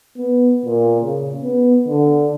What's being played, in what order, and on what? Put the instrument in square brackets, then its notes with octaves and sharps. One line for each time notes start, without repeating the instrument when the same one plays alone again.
[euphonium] B3
A#2
C#3
B3
D3